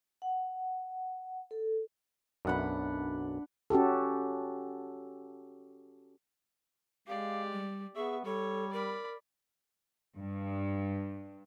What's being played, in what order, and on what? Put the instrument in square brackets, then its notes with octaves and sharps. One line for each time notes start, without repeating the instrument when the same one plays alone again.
[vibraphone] F#5
A4
[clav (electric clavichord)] B1 F#2 [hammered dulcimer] D4 F#5 B5
[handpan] C#4 F#4 G4 A4
[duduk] G#3 [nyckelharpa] G4 D5 [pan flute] F5
[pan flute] G3
[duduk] B3 [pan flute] G#4 [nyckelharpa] E5 C#6
[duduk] G3 [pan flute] A4 [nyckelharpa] C#5
[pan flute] A#4 [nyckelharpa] D5 B5
[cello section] G2